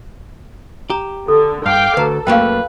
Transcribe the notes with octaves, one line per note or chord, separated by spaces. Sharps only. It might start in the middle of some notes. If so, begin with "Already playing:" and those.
G4 A#5
D3 A4
G2 F5 G5 D6
D2 A4 B4 A#5
F#2 A3 A#3 B4 F5 G5